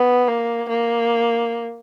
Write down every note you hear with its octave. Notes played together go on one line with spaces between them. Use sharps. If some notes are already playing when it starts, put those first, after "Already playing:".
Already playing: B3
A#3
A#3